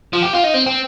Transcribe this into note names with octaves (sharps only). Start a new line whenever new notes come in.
F3
G4
F4
D#4
C4
C4